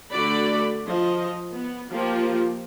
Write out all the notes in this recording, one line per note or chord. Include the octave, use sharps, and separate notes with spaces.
D3 A3 F#4 A4 D5 B5
F3 D#5
B3
F3 A#3 F4 G4